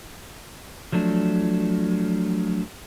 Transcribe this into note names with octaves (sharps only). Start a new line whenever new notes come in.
F3 F#3 A3 D4